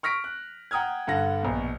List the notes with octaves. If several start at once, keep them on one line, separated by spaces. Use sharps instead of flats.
C#6 F6 A#6 B6 D7
F#6
F#5 G5 A#5 D#6 F6 G#6
G2 D3 F#5 A#6
A#1 B2